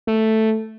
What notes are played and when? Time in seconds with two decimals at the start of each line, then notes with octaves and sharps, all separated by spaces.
0.07 A3